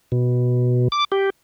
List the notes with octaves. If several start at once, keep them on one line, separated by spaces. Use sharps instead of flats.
B2
D6
G4